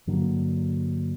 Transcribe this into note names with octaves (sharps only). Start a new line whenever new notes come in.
G2 D3 F#3 A#3